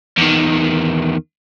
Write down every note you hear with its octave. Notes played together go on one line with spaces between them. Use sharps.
E2 D#3